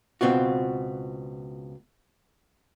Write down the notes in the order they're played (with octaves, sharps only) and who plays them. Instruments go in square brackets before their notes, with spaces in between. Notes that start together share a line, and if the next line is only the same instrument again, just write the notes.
[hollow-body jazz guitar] C#2 B2 C4 F4 F#4